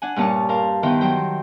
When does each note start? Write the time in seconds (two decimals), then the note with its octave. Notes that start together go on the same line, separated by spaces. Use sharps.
0.02 D4 F#5 G#5
0.16 G2 A#2 C#4 A5 C#6
0.49 A#4 C5 F5 A5
0.83 D#3 E3 B3 C5 G5
1.01 F#3 C5 G5